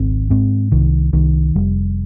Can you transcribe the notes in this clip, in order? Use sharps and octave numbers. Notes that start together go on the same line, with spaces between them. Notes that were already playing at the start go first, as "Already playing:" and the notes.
Already playing: G#1 C#2 C4
G#2 C4
C2 D#3
C2 D#3
F1 G3